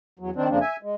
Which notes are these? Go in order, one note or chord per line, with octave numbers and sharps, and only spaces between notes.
E2 F#3
D#3 C4 D4
F2 C#3 F3 A#3 D4
E5 G#5
G#3